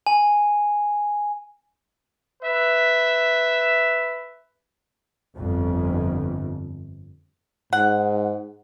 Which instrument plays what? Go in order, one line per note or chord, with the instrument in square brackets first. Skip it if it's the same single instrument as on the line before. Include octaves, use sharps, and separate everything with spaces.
[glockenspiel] G#5
[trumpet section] B4 E5
[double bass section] G1 F2
[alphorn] G#2 [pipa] F#5